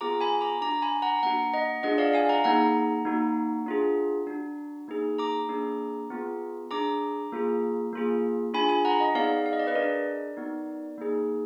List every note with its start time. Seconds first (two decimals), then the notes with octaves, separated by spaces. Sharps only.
0.01 B3 F4 G#4 A#5 D6
0.21 G#5 B5
0.41 A#5 D6
0.61 D4 F#4 A#5 D6
0.82 G#5 B5
1.02 F#5 A#5
1.23 A#3 D4 F#4 F#5 A#5
1.54 D#5 F#5
1.83 D4 F4 G#4 D#5 F#5
1.98 D5 F5
2.13 F5 G#5
2.29 F#5 A#5
2.44 A#3 D#4 G#4 F#5 A#5
3.05 A#3 D#4 F#4
3.66 D4 F4 G#4
4.27 D4 F#4
4.88 A#3 D#4 G#4
5.18 A#5 D6
5.49 A#3 D4 G#4
6.10 B3 F4 G#4
6.71 D4 G#4 A#5 D6
7.32 A#3 F4 G#4
7.93 A#3 F4 G#4
8.54 D4 F4 G#4 G#5 B5
8.69 G#5 B5
8.85 F#5 A#5
9.00 D#5 F#5
9.15 B3 D#4 G#4 D5 F5
9.46 F5
9.53 D#5
9.60 D5
9.67 B4 D#5
9.75 D4 G#4 A#4 D5
10.37 B3 D#4 F#4
10.98 A#3 D#4 G#4